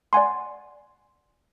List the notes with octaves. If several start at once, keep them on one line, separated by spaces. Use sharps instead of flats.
D5 F#5 G#5 C6